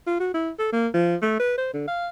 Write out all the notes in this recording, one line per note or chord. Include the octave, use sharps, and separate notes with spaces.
F4
F#4
E4
A4
A#3
F3
A3
B4
C5
D3
F5